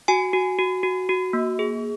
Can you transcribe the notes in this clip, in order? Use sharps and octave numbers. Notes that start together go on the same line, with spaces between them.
F#4 G#5
F#4
F#4
F#4
F#4
A#3
G#4